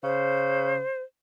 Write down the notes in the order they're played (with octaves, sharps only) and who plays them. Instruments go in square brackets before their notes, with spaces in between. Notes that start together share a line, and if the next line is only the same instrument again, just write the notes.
[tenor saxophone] C#3 [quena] C5